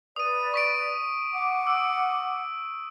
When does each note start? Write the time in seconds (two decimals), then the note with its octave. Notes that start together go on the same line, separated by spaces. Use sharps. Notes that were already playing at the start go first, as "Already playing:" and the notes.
0.16 B4 D5 D#6 D#7
0.54 C#6 B6 D7
1.33 F#5 D6
1.67 E6 D7